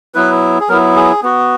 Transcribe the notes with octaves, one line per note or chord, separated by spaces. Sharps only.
F#3 B3 E4 B4
G#4
F#3 B3 E4 A#4
G#4
B3 F#4